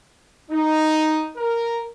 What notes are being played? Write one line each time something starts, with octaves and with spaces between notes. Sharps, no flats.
D#4
A#4